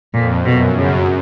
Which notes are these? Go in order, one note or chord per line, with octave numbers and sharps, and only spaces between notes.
F2 A#2
F#2 B2
F#2 C#3